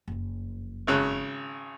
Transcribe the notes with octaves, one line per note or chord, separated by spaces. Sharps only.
F#1 F2
G#1 C#3 F#6